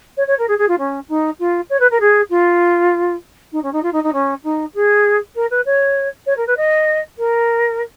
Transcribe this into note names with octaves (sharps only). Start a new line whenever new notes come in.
C#5
C#5
A#4
G#4
G#4
F4
C#4
D#4
F4
C#5
B4
A#4
G#4
F4
D#4
C#4
D#4
F4
D#4
D#4
C#4
D#4
G#4
A#4
B4
C#5
C#5
A#4
B4
D#5
A#4